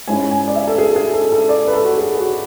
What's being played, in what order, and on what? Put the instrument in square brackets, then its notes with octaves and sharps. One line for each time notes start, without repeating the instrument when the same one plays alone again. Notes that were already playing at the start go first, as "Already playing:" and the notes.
[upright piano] G#2 G#3 C#4 E4 G#5
G#5
D5
E5
A4
G#4
A4
G#4
A4
A4
D5
B4
A4
F#4
G#4
G#4
F#4